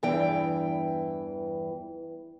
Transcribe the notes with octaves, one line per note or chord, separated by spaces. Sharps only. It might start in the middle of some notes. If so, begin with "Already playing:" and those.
E2 G2 E3 G5